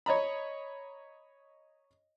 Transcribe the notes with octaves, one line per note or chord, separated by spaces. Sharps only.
C#5 D#5 A#5 B5